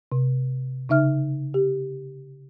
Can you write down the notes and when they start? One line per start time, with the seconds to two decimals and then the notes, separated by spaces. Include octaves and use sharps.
0.12 C3
0.89 C#3 D#4 E5 F6
1.54 G4